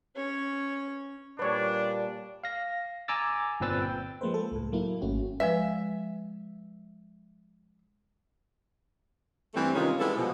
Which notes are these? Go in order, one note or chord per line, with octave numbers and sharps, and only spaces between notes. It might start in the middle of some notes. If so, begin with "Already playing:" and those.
C#4 C#5
A#2 G3 D4 B4 C#5
F5 A#6
G#5 A#5 D6 E6 A6
G1 A#2 C4 B4 E6 A6
G5
F3 G#3 A#3 B4 C5
A4
C#2 A2
F#3 A#3 E4
G#1 A3 C#4 F#4
F3 G#3 B4 E5
G2 E3 G3 A3 C4
C3 D#3 G#3 B3 C#4 F4
G3 G#3 B3 E4 A4
B2 F3